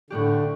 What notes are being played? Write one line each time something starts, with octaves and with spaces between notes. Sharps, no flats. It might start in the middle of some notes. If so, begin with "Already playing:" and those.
A2 D3 A3 D4 G4